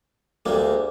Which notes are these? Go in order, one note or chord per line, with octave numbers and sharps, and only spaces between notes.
D2 G3 G#3 A#3